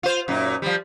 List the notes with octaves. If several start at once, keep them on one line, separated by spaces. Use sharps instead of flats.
F4 C5
F#2 A#2 D#4
F3 G3